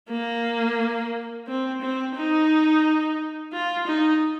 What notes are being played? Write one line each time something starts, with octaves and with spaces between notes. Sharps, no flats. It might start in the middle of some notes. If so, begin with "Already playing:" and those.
A#3
C4
C4
D#4
F4
D#4